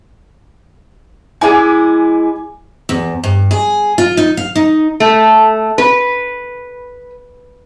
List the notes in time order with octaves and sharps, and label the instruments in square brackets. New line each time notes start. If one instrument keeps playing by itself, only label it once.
[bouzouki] G#3 E4 [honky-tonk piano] G#5 D6 G#6
[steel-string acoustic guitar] E2
G2
G#4
F4
D#4
F5
D#4
[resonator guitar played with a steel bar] A3
B4